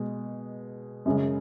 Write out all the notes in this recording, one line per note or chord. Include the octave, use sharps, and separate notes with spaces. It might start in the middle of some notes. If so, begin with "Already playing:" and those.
Already playing: B2 G#3
F#2 C#3 G#3